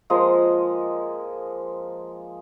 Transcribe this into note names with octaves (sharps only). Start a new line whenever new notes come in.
F3 G#3 A#3 D#5